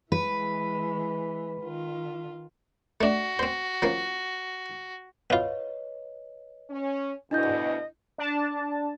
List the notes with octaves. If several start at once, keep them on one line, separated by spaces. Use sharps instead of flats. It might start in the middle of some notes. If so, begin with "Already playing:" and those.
E3 G#3 B4
D#3 F4
A3 D4 F#4
C4 C5
F3 A#3 C#4
B3 F4 B4 C#5 D#5
C#4
D2 B2 D4 E4 D#5 G6
D4 A5